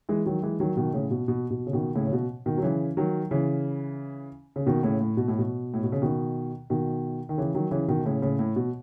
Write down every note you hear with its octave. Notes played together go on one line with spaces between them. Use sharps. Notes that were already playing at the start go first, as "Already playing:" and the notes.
E3 G#3
D#3 F#3
E3 G#3
D#3 F#3
B2 D#3
A2 C#3
B2
B2
B2
C#3
B2 D#3
A2 C#3
C#3
B2
B2 D#3
F#3
C#3 E3
D#3 F#3
C#3 E3
C#3
B2 D#3
A2 C#3
A2
B2
A2
B2
A2
B2
C#3
B2 D#3
B2 D#3
D#3
C#3 E3
D#3 F#3
C#3 E3
B2 D#3
A2 C#3
A2 C#3
A2
B2